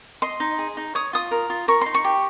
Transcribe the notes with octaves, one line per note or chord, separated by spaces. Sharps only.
D#5 C6
D#4
G#4
D#4
C#5 D#6
F4 D#6
A#4
F4
A#4 C#6
D#4 C6
C#6
G4